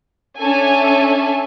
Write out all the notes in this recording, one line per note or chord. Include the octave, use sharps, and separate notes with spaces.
C#4 D4 A4 E5 G#5